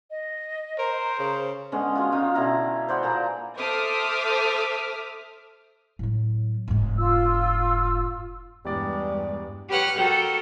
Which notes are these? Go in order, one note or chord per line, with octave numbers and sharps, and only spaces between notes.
D#5
A#4 C5 A#5
C#3
D3 G#3 B3 C#4
F4 F#4 G#4
C#3 D#4 F4 F5
B2 D3 E4 A#5
C5 D5 F#5 B5
A#2 A#3 G#4 A#5
A4 C5 E5 D6 D#6 F6
A2 F#3
F1 G#2
F4 E6
E2 G2 G3 G#3 D5 D6
G4 B4 C#5 F#5 F6 F#6
F#4 A4 A#4 G5